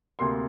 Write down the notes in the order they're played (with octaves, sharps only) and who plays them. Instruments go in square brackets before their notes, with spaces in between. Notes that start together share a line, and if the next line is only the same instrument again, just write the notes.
[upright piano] D2 C3 A#3 C6